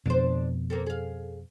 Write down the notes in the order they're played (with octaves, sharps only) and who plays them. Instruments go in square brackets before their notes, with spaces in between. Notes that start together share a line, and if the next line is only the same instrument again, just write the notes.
[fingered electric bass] F2 B2 [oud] D4 C5
[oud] A#3 C4 A4
G#4 F5